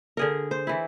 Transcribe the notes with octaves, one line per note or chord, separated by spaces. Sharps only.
D3 G#4 A#4
C5
E3 E4